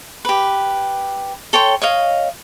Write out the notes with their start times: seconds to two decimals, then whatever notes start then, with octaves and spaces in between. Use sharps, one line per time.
0.25 G4 B4
1.53 A4 C#5 G5 C6
1.82 C#5 D#5 F5